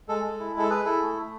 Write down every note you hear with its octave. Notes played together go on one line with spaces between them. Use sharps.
G#3 A4
G#3
E4
G#3 A4
G#4 B4
E4 A4
A3
A3